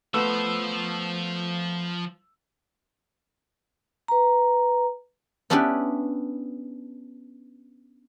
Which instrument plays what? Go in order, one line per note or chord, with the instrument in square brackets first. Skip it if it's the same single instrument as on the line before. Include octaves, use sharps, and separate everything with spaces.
[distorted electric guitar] F3 C5 [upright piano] A3 B3 E6
[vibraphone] B4 A#5
[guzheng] B3 C#4 D4 E4 G4 B4